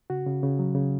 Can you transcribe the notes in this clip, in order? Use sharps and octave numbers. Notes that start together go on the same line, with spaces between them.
C#3 F#4
C#3
C#3
F#3
C#3